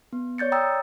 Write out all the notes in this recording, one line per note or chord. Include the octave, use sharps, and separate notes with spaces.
B3
C#5 D5 G6 A6 C#7
G5 A#5 D#6 E6 A6